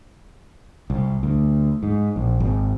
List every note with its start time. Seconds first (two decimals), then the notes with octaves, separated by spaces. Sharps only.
0.90 C2
1.23 D2
1.83 G#2
2.16 A#1
2.40 G#1